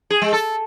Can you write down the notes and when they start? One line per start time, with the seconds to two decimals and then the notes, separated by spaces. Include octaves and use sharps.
0.10 G#4
0.22 G#3
0.33 A4